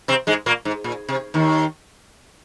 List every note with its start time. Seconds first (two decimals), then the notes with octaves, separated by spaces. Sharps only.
0.08 C3 C4
0.27 G#2 G#3
0.46 A#2 A#3
0.65 G#2
0.84 A#2
1.09 C3
1.34 D#2 D#3